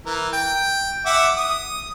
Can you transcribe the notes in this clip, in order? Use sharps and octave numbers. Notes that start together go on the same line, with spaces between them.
E3 A#4
G5
E5 F#5 D6
D#6